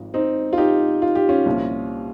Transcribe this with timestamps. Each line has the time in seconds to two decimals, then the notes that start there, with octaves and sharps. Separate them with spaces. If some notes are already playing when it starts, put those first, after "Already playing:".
Already playing: G#1 G#2 F3
0.14 C4 D#4
0.53 F4
0.58 D#4 G4
1.02 F4
1.15 G4
1.29 C#4 F4
1.46 C2 A#2 F3